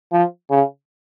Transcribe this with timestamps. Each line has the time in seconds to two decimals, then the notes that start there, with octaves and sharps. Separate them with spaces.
0.12 F3
0.50 C#3